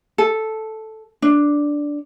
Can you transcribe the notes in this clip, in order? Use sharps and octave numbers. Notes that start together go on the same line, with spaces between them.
A4
D4